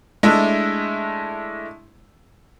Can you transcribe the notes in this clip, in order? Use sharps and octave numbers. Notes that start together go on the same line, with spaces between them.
G#3 A3 D4 E4 E5